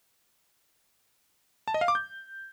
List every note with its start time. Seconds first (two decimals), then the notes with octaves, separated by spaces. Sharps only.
1.68 A5
1.74 D#5
1.81 F5
1.88 D6
1.95 G6